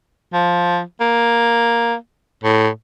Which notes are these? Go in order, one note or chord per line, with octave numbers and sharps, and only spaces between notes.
F3
A#3
A2